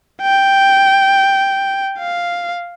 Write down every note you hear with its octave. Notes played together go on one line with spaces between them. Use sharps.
G5
F5